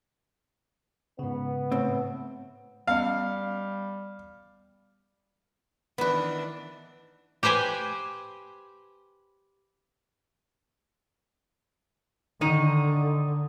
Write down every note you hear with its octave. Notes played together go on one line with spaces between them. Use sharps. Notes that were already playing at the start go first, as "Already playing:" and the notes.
G#2 C#3 B3
A2 C4
G3 B3 C#4 D#5 F5
D#3 E3 B3 D4 B4
G4 B4 C5 G5 G#5
D3 D#3 D#4 D#5